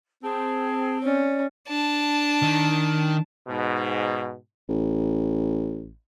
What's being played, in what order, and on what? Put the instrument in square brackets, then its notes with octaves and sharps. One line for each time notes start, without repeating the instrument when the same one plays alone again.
[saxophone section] C4 [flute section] G#4 A5
[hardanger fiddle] C#4 [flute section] D5
[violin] D4 A5
[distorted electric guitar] D#3
[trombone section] G#2 B2
[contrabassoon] A1